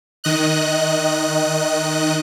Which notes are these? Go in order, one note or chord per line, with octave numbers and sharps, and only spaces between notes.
D#3 D#5 F#6